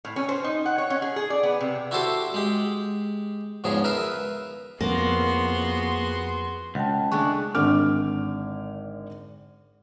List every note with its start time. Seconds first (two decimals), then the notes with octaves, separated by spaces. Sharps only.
0.05 A2
0.16 C#4
0.29 C5
0.44 D#4
0.66 F#5
0.78 C#5
0.90 C#4
1.02 G#4
1.16 G#4
1.30 D5
1.43 B3
1.60 C3
1.91 E4 F#4 G4 A4 C5 D6
2.34 G#3 G4
3.64 E2 G#2 C#3 F3 G#4
3.84 A#4 B4 E5
4.81 F2 A#3 B3 F#4 G#4 C6
6.75 C#2 F#5 G5 A5
7.12 G#3 A3 D4 C#6 F#6
7.55 G#1 D3 D6 F6